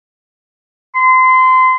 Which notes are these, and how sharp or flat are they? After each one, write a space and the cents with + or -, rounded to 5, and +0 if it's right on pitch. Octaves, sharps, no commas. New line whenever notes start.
C6 -25